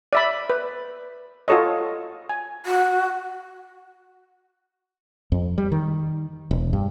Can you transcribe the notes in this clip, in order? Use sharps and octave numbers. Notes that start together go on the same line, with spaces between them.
D5 E5 B5
B4
F4 F#4 A4 C#5 D#5
G#5
F#4
F2
G3
D#3
E1
G2